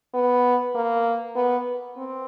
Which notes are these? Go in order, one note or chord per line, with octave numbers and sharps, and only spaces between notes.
B3
A#3
B3
C4